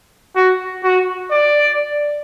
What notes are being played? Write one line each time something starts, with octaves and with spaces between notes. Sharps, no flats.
F#4
F#4
D5